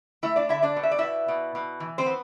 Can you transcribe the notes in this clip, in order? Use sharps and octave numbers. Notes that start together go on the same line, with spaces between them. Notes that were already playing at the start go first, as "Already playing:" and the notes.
A3 E4 E5
D4 D5
D3 E4 E5
D4 D5
B2
E5
D5
B3 E4 E5
B2
B2
E3
C4 C5
B3